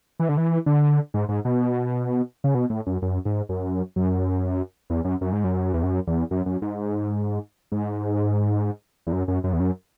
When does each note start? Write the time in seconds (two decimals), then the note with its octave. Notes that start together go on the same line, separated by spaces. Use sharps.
0.20 E3
0.29 D3
0.37 E3
0.66 D3
1.14 G#2
1.29 G#2
1.45 B2
2.44 C#3
2.55 B2
2.70 A2
2.86 F#2
3.02 F#2
3.25 G#2
3.49 F#2
3.96 F#2
4.90 E2
5.05 F#2
5.21 F#2
5.33 G#2
5.44 F#2
5.74 E2
5.83 F#2
6.07 E2
6.31 F#2
6.46 F#2
6.62 G#2
7.72 G#2
9.07 E2
9.12 F#2
9.28 F#2
9.44 F#2
9.53 E2
9.60 F#2